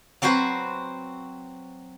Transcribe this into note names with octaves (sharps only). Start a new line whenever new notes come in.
F#3 C4 F#4 B4 C5